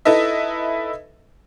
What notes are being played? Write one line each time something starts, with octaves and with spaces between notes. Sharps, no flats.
D#4 E4 A4 B4 D#5 E5